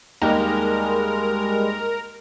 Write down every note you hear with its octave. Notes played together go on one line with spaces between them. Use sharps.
D#2 G3 G#3 D#4 G4 A#4